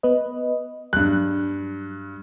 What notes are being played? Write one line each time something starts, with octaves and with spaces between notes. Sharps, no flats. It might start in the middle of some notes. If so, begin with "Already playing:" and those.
B3 B4 D#5
G2 F#3 F#6